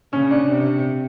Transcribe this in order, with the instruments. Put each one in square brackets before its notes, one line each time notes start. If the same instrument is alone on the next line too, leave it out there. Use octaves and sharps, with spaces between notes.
[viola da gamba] C#3 [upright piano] C#4
[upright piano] D4
[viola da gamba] C3